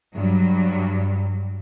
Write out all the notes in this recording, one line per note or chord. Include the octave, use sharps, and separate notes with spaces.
G2 F#3